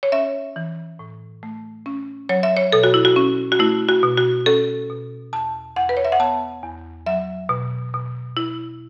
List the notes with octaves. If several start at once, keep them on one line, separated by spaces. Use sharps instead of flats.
C#5
C#4 E5
E3
A2
A3
C#4
F#3 C#5
E5
C#5
B2 A4
F#4
E4
F#4
C#4
F#4
A3 E4
F#4
B2
F#4
C#4 A4
B2
E2 A5
E2 F#5
B4
C#5
E5
F#5
B3 A5
E2
F#3 E5
B2
B2
E4